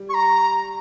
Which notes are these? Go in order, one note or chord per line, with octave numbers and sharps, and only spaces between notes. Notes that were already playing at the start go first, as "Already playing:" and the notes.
Already playing: G3
C#6
A#5